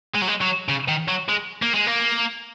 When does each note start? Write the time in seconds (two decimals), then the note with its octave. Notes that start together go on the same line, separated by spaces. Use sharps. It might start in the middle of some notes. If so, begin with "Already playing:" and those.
0.14 G#3
0.21 F#3
0.28 G#3
0.41 F#3
0.69 C#3
0.88 D#3
1.08 F#3
1.29 G#3
1.62 A#3
1.74 G#3
1.87 A#3